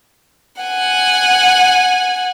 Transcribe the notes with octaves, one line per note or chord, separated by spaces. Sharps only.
F#5 G#5